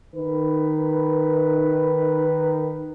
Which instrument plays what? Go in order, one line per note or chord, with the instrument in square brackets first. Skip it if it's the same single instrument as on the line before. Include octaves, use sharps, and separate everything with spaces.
[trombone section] D#3 B4